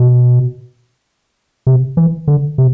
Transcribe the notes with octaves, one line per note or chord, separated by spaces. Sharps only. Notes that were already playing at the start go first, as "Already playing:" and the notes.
Already playing: B2
C3
E3
D3
C3